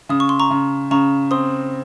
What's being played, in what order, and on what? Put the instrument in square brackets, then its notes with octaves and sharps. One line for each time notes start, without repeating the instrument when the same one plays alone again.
[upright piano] C#3 [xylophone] D#6
[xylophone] C#6
C6
A#5 C#6
[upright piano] C#3
[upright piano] C#3 [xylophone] A#5 C#6
[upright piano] C4 [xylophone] C6 D#6